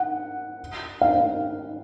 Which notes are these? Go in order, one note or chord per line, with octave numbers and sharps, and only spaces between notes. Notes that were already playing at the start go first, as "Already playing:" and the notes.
Already playing: F#5
F5